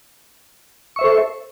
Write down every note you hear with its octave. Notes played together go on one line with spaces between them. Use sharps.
A4 C5 E5 C#6